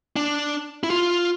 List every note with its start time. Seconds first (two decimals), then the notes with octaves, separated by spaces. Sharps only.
0.16 D4
0.83 E4
0.90 F4